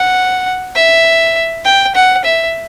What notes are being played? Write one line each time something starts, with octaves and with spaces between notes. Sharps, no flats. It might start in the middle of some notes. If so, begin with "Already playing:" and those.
Already playing: F#5
E5
G5
F#5
E5